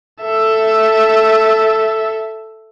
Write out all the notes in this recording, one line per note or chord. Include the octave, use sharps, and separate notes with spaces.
A4 E5